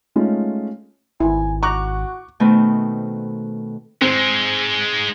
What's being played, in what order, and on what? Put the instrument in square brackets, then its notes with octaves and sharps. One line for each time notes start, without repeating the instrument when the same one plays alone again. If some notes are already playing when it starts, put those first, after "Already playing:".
[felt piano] G#3 A3 C#4 D#4 F4
[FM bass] G#1 [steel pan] E4 [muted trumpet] G#5
[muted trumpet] F#4 [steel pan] A#5 [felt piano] C#6 D6 F#6
[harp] B2 D#3 A3 B3 C4
[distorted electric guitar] G#2 G#3 [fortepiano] C4